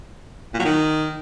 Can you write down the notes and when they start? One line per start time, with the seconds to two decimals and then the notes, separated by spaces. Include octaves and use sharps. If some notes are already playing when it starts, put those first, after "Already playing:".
0.54 A#2
0.59 F#3
0.65 D#3